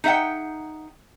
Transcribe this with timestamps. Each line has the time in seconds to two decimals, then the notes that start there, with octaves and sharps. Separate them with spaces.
0.04 D#4 G#4 E5 F#5 G5